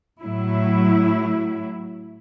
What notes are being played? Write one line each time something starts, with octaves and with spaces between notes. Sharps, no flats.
A2 F#3 E4